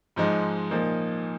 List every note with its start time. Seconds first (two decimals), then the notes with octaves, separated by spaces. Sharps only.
0.16 G#2 F3 G#3 D#4
0.70 A#2 F3 A#3 D#4